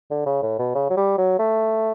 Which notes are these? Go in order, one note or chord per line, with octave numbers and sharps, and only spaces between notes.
D3
C#3
A2
B2
C#3
F#3
G3
F#3
A3